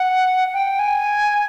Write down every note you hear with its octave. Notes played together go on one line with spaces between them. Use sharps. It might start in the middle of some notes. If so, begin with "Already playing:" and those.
Already playing: F#5
G5
G#5